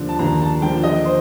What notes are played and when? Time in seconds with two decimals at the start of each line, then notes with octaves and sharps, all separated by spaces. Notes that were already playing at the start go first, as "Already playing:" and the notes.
Already playing: D#2 D3 F3
0.09 A5
0.19 D#2 A#5
0.41 A5
0.62 D3 F3 G5
0.83 D#5
1.05 C5